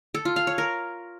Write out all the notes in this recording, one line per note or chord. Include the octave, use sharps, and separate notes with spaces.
A4
F4
F5
C#5
A#4